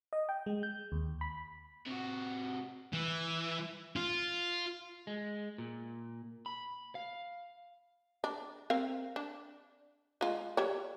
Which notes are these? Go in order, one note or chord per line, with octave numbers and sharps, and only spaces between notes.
D#5
G5
G#3
G6
D#2
B5
C3 F#4
E3
F4
G#3
A#2
B5
F5
D4
C4 A#4 F5
D4
G#3 F4
G3 C#5